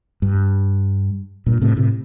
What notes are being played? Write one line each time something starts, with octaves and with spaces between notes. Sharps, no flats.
G2
G2 A#2
A2 C3
A2 C3